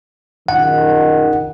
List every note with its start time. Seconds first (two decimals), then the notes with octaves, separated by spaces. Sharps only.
0.48 A#1 F#2 D#3 F#5